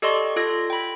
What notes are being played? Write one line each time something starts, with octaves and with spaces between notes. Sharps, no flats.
G4 A4 D5 D#5 C6 C#6
F4 A4 G#6 A#6
G5 B5